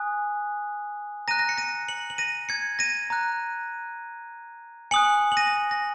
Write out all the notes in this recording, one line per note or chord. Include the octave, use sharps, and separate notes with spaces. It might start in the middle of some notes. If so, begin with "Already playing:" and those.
Already playing: G#5 D#6 F#6
A#5 F#6 A#6 D#7
A#6
C#7
A#6 D#7
C#7 F#7
F#7
A#6 D#7
G#6 C#7
A#6 D#7
A#5 F#6
G#5 D#6 F#6 C#7 F#7
F#7
A#6 D#7
A#6